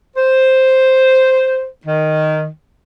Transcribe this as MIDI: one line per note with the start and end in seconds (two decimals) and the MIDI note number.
0.16 1.67 72
1.86 2.48 51